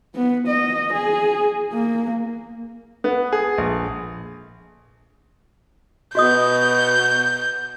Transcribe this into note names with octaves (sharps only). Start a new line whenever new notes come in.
B3
D#5
G#4
A#3
B3
G#4
A#1
B2 F#4 D#5 D#6 G6